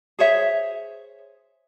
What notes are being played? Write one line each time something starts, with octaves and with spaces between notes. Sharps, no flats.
G#4 C5 C#5 E5